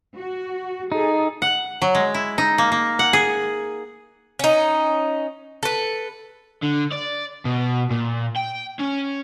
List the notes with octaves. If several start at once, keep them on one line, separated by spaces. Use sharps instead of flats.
F#4
D#4 G#4 A4
F#5
F#3
G#3
E4
D#4
A#3
A#3
F#5
G#4
C#4 D#4
A4 B4
D3
D5
B2
A#2
G5
C#4